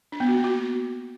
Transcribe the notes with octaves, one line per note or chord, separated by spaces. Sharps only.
D4
B3
F#4
A#3
F#4